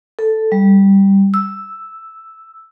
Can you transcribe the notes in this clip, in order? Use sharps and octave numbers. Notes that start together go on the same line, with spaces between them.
A4
G3
E6